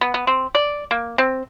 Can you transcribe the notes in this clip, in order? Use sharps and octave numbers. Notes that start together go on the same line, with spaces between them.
B3
B3
C4
D5
A#3
C4